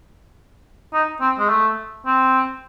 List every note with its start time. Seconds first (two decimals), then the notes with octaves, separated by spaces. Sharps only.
0.94 D#4
1.21 C4
1.38 G#3
1.49 A3
2.06 C4